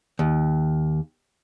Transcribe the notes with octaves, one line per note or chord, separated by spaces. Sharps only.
D#2